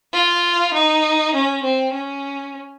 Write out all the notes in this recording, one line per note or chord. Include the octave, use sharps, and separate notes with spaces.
F4
D#4
C#4
C4
C#4